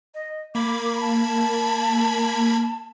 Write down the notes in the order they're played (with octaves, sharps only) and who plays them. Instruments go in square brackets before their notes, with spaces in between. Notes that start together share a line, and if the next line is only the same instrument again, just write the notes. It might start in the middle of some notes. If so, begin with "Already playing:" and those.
[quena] D#5
[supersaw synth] A#3 B5 G#6 [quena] D6
[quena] A5